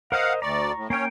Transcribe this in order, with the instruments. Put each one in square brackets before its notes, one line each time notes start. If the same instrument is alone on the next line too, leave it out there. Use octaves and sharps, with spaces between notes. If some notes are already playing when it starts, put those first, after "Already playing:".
[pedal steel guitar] A#4 C5 D#5 [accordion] F5 F#5
[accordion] D2 D5 [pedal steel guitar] A#5 C#6
[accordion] A2
[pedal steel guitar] A#3 G5 [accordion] C#4 C#5